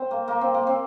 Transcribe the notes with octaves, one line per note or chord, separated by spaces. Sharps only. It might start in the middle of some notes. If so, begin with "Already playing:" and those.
Already playing: C4
A#3
A#3
C4
A#3
C4